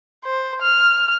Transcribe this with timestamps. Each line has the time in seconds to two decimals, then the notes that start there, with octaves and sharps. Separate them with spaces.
0.24 C5
0.62 F6